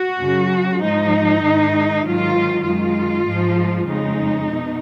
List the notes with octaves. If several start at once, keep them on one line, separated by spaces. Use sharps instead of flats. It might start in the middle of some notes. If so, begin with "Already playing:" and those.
Already playing: F#4
F#2 C#3 F#3
G#2 F3 G#3 D#4
G#2 D#3 G#3
G#2 D#3 F#3 F4
F#2 D#3 G#3 F4
G#2 F3 G#3
F2 C#3 G#3 D#4
B2